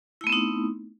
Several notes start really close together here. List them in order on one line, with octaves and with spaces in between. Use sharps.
E4 A3 B3 C4 D#4